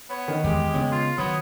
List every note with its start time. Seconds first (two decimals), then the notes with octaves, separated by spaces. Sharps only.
0.10 B3 C#5
0.28 D#3
0.44 E2 G#3 G4
0.74 C#3 B3 C#5 G5
0.92 F4 C6
1.18 D#3 F#3 B3 C#5 D#6